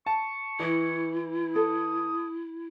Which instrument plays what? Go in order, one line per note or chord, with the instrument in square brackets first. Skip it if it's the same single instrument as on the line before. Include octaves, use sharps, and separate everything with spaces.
[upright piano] A5 [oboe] C#6
[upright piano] E3 [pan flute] E4 [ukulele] D#5
[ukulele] A4 [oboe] D#6